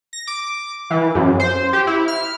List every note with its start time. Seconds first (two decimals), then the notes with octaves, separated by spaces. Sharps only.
0.13 A#6
0.27 D6
0.90 E3
1.15 F#2
1.40 C5
1.73 G4
1.87 E4
2.08 F6